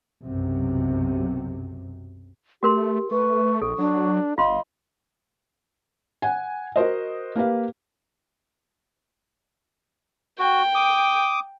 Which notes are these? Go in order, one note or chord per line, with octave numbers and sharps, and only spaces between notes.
B1 F#2 C3
A3 F#4 G4 A#4 C6
A3 B4 C#6
A#1 A4 C#6
F#3 D4
G1 F4 D#5 F5 C6
F#5 G#5
F#4 A#4 C5 D#5
A#3 G4 B4 F5
F#4 G5
D6 D#6